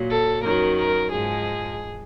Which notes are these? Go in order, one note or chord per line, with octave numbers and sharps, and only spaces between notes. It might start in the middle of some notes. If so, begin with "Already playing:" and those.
Already playing: A#2 F#3
A4
F#2 D#3 F#3 A#4
A#4
G#2 F3 G#3 G#4